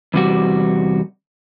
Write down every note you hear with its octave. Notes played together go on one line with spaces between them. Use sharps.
E2 C3 G3 F#4